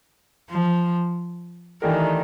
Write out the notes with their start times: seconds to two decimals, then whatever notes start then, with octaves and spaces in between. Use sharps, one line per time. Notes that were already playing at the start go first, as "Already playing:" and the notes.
0.51 F3
1.82 D#3 E3 A3 D4 G4 A#4